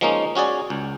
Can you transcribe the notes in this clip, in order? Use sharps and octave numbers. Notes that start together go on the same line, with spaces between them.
F3 G#3 A#3 C#4 D#4
C#4 F#4 G#4 D5
C#2